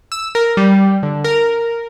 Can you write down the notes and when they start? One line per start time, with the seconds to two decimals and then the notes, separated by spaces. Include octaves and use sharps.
0.12 E6
0.35 A#4
0.57 G3
1.03 D3
1.24 A#4